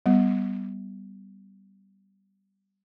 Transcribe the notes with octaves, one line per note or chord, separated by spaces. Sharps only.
G3 B3